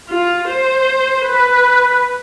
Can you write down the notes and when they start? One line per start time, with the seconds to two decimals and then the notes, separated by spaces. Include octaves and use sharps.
0.10 F4
0.49 C5
1.25 B4